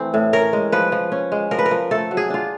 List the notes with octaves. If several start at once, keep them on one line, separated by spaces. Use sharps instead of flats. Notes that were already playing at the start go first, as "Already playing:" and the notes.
Already playing: E3 A3 C4
A2
C#4 A#4
G#3
F3 B4
F3
C#4
G#3
F3 A#4
B4
A#4
F3
A3 A4
F#3
G#4
D4 F4